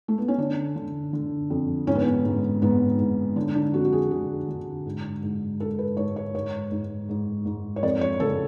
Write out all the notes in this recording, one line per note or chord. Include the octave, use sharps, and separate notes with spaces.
A3
B3
C#4
D3 D4
D3
D3
F2
G#2 C#4
B3
C#4
G#2
G#2 B3
G#2
D3 D4
D4
F2 F#4
F#4
G#4
D3 G#4
D3
G#2
G#2
G#2 A4
B4
G#2 C#5
C#5
G#2 C#5
G#2
G#2
G#2
C#5
F2 D5
C#5
C#3 A4